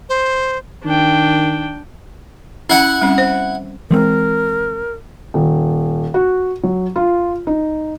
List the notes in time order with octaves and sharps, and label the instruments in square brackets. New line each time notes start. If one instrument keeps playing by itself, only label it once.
[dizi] C5
[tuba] D#3 [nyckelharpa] D4 G5
[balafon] C#4 [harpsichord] E4 F#5
[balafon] G3 C4 C#4
C5
[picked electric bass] E3 G#3 C4 [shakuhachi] A#4
[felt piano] D#1
F#4
F#3
F4
D#4